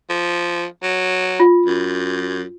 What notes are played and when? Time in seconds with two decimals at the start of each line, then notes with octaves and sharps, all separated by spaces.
0.10 F3
0.83 F#3
1.40 F4
1.66 F#2